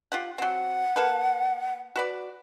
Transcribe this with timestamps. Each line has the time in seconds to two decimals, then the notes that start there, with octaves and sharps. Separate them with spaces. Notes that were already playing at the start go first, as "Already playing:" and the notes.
0.12 F4 G4 F#5
0.38 F#3 C4 F#5
0.96 A#3 A4 B4
1.96 F#4 B4 D5